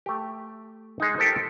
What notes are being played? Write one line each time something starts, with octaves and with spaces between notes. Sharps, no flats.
A3 G4
G#3 D#4
F4 G4 A4 A#4 C5